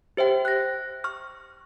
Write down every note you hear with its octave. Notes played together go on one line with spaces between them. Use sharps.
G4 C5 E5 G5
F#6 A#6
C#6 F6